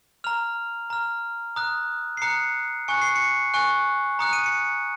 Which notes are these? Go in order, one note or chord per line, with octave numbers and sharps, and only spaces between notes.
A#5 F6 F7
A#5 F6
A#5 D#6 F#6
C7
A#5 D#6 F#6 C#7
G#5 C#6 F#6 C#7
C7
C#7
G#5 C#6 F#6
A#5 D#6 F#6 C#7
D#7
C#7